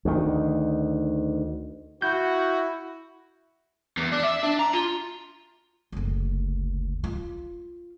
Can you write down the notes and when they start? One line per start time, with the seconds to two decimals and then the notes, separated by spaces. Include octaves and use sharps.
0.05 D2 D#3
2.02 E4 F#4 G6
3.98 E2
4.12 D4
4.24 E5
4.43 D4
4.59 A#5
4.73 F4
5.92 F#1 D2
7.04 F4